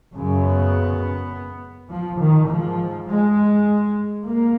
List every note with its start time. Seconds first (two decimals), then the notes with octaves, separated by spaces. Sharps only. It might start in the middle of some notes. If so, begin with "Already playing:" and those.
0.14 F#2 C#3
0.44 B3
1.90 F3
2.20 D#3
2.49 G#2 F3
3.08 G#3
4.25 A#3